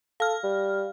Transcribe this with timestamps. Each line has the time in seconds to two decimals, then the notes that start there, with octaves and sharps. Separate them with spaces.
0.20 A4 F5 F6
0.44 G3